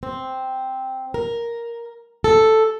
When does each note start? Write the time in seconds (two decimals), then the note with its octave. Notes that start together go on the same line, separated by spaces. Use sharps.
0.03 C4
1.14 A#4
2.24 A4